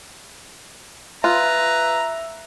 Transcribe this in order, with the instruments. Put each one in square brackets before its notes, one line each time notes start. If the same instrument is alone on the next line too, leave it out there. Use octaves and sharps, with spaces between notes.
[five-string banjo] F4 [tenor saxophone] B4 [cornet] E5 [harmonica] A#5